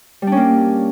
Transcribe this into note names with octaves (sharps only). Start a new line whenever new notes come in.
G3 A#3 C#4 D4